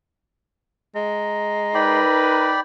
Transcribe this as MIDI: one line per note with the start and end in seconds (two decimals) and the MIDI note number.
0.95 2.01 56
0.95 2.56 82
1.74 2.60 63
1.74 2.60 70
1.74 2.60 71
1.74 2.60 74
1.74 2.60 79
1.74 2.60 83